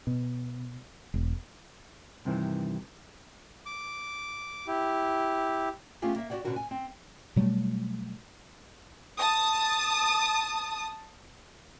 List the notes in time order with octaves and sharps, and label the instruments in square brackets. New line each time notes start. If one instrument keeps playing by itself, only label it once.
[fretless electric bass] B2
E1
[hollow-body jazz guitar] G2 C3 D#3 E3
[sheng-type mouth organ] D6
E4 G4
[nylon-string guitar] A3 B3 C#4 F4 G4 G#4
A#3 E5
F#4 G4 C#5 D5 F#5
B2 D3 C#4 F#4 A#4
G#5
C4
[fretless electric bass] B2 F#3 G3 A3
[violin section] A5 D#6